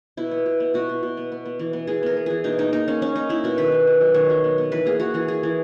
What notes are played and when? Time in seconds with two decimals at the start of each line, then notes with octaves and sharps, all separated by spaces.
0.17 B2 E4
0.31 B3
0.46 B2
0.60 B3
0.74 B2 F#4
0.89 B2
1.03 B2
1.17 B3
1.32 B3
1.45 B3
1.59 E3
1.73 B3
1.87 E3 G#4
2.03 B3 A#4
2.17 B3
2.26 E3 G#4
2.44 B2 D#4
2.58 A#3 D#4
2.72 A#3 D#4
2.88 A#3 C#4
3.01 A#3 C#4
3.15 A#3 D#4
3.29 A#3 E4
3.44 B2 F#4
3.58 D#3 B4
3.72 B3
3.87 D#3
4.01 F#3
4.14 D#3 C#5
4.29 F#3
4.44 B3
4.58 B3
4.72 E3 B4
4.86 A#3 G#4
4.99 A#3 F#4
5.14 E3 G#4
5.28 A#3 G#4
5.43 E3